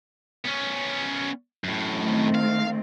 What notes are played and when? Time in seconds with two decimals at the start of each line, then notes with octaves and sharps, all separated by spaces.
0.45 B3 C#4
1.64 F#2 A2
1.99 D#3 A3 C4
2.35 F5